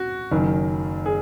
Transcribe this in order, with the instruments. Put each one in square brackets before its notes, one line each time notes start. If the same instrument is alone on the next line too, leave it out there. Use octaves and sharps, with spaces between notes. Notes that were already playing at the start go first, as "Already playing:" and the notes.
Already playing: [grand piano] F#4
F#1 F#2 D#3
G#4